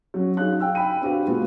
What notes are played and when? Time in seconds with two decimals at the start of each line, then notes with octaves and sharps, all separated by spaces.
0.14 F#3 C#4
0.37 F#3 D#4 G#4 F5 F#6
0.60 F5 G5 E6
0.75 G5 B5 D#7
1.02 C4 D4 F#4 G4 B4 F5
1.27 A#2 G#3 B3 F4 F#4